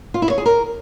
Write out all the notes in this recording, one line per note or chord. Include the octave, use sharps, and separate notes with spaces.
F4
E4
C#5
G#4
A#4